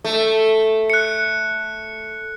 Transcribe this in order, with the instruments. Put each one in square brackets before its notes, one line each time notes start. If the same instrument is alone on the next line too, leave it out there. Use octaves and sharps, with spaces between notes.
[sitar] A3
[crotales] F#6 C#7